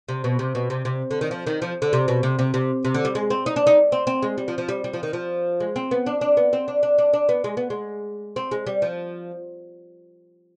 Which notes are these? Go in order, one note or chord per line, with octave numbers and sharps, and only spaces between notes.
C3
B2
C3
B2
C3
C3
D3
D#3
F3
D#3
F3
D3
C3
B2
C3
C3
C3
C3
D3
G3
G#3
C4
D#4
D4
D#4
C4
C4
G#3
G3
F3
F3
G3
G3
F3
D#3
F3
G#3
C4
B3
D4
D4
B3
C4
D4
D4
D4
D4
B3
G#3
B3
G#3
C4
G#3
G3
F3